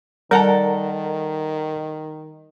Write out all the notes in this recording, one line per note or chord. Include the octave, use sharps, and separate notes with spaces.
D#3 G3 A4 A#4 D5 F#5 A#5